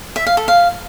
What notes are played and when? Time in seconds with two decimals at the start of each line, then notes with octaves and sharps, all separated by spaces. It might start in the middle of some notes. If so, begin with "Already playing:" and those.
0.16 E5
0.26 F5
0.37 A4
0.48 F5